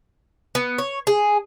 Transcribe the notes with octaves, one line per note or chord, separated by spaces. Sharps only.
B3
C#5
G#4